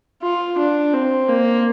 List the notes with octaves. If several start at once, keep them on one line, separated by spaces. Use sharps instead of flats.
F4
D4
C4
A#3